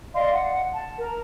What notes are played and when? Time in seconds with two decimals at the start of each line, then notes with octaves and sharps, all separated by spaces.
0.14 D5 D#5 F5 C6
0.32 F#5
0.72 A5
0.97 A#4